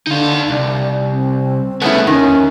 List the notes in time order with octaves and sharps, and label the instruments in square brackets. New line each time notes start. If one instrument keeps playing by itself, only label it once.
[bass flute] D3 [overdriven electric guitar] D#4 F5
[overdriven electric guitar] C2 [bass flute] D5
[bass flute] C4
[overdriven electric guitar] A3 G#4 [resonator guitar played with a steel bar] B3 C#4 E4
[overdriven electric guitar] D#2 [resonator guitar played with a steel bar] D#3 [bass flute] C#4